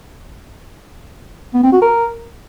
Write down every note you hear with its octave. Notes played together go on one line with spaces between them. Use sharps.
B3
C4
F#4
A#4